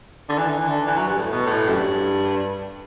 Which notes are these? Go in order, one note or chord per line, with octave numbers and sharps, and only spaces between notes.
D3
E3
D3
E3
D3
E3
F#3
G2
A2
B2
A2
F#2
G2